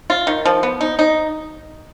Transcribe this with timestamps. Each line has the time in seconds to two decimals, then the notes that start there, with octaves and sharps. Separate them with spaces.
0.10 F4
0.27 D#3
0.45 F3
0.63 B3
0.81 D#4
0.99 D#4